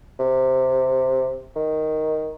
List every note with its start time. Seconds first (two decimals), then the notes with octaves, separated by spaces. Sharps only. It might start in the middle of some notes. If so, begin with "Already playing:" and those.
0.19 C3
1.56 D#3